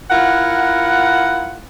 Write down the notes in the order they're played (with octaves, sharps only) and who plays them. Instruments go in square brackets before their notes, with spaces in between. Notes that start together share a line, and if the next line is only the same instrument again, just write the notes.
[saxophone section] E4 F4 A#4 F#5